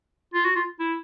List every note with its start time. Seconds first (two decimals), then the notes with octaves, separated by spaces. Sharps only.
0.34 F4
0.45 F#4
0.56 F4
0.79 E4